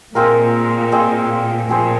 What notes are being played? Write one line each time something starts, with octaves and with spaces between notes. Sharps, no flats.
A#2 G#3 C4 F4 A#4
C4 G#4 D#5
A#2 F3 C4 G#4 C5